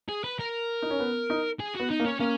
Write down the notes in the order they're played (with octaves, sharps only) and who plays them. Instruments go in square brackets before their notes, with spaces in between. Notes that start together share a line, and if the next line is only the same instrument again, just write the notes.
[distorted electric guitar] G#4
B4
A#4
[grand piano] D#4
C#4
B3
D#4
[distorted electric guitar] G#4
[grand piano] B3 [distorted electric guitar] F#4
[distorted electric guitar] D#4
[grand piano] A#3
[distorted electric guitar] C#4
[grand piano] A#3 [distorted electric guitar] C#4